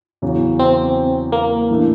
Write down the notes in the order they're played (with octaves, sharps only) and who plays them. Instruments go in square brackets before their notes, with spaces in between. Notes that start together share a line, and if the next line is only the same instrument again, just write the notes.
[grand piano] E2 C#3 F#3
[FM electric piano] C4
A#3
[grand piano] A2 E3 A3 D4